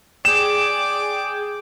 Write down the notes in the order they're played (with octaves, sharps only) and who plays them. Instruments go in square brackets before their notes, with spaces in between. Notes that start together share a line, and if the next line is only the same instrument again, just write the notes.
[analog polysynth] G#4 G5 [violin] D5 D6 [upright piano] E7